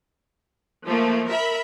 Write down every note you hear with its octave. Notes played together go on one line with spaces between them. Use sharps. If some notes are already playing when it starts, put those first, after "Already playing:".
F3 A3 A#3
A#4 E5 B5